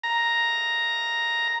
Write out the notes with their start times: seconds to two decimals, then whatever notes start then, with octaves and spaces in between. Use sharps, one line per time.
0.03 A#5